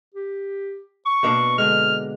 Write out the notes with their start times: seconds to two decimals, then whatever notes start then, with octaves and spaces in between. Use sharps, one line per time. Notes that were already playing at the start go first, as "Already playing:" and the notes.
0.14 G4
1.06 C#6
1.23 B2 A#3 D4
1.58 D3 G#3 F6